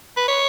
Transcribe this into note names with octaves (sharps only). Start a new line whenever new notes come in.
B4
C#5